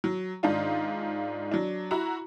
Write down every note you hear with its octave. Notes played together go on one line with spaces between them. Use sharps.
F#3
G#2 D#3 D4 F4
F#3 D4
E4 F#4 A#5